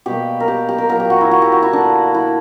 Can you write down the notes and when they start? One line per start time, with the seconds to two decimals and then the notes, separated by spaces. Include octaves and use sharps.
0.06 B2 G3 A#3 G4
0.40 A#4
0.48 G4
0.69 G4
0.78 A#4
0.89 A#2 F#3 A#3 A#4
1.00 G4
1.10 F#4
1.21 E4
1.31 F#4
1.42 G4
1.52 F#4
1.62 E4
1.72 D3 A#3 D4
2.14 E4